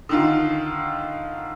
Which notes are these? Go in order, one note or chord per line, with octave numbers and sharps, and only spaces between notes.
D3 D#3 F4